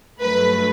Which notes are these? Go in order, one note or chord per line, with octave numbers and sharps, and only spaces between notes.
G2 F#3 A3 B4